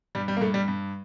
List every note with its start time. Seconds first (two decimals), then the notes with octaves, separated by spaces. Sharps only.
0.15 G2 G3
0.28 G3
0.37 A#3
0.41 G2 A3
0.54 G3
0.68 G2